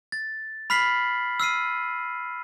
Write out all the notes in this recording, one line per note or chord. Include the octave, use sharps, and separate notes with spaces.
A6
B5 F6 B6 C7 F#7
E6 F6 C7 D#7